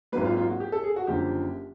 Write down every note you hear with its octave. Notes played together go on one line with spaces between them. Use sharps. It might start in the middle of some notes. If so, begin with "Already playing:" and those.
G#1 G#2 D#3 F#3 A#3 B4
F4
F4
F#4
G4
A4
G#4
F#4
F#1 F#2 D3 F3 A#3 G4